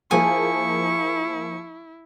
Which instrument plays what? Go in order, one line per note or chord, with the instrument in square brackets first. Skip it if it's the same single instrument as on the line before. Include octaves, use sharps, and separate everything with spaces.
[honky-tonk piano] F3 A#3 G#4 [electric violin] E4 [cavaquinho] G#5 D#6 [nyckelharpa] C#6